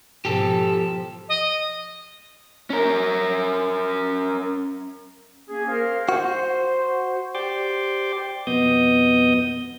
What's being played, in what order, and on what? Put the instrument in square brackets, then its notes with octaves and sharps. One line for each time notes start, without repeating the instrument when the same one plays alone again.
[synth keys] G#2 B2 [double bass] F3 [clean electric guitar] G4 A4
[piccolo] D#5
[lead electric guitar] C#4 A#4
[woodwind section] A#3 C#4 G#4
A#4 C5 F5
[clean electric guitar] F#4 [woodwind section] C5
[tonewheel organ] G4 C5 D5 G5 C6 D6
F2 B2 B3 D#5 D#6 G6